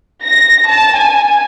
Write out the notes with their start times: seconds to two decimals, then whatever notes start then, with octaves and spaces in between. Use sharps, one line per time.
0.23 A#6
0.68 A5
0.97 G#5